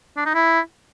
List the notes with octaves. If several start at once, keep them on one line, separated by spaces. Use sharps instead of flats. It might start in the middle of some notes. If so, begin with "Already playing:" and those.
D4
D#4
E4